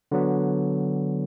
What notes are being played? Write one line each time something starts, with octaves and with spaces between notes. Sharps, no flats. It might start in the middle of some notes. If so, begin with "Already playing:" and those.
D3 F#3 B3